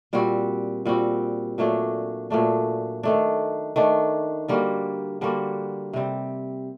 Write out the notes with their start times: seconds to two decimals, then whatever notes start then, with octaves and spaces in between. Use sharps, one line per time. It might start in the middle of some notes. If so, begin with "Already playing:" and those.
0.13 A#2 G3 C4 F#4
0.86 A#2 G3 C4 F#4
1.58 A#2 F#3 A3 D4
2.30 A#2 F#3 A3 D4
3.03 D#3 A3 D4
3.76 D#3 A3 D4
4.48 D3 G3 A#3 F#4
5.21 D3 G3 A#3 F#4
5.93 C3 G3 C4